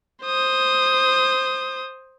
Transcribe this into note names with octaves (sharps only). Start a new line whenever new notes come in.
C5 D#6